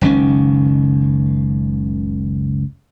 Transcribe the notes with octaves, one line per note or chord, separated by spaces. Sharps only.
F#1 C#2 D#3 C#4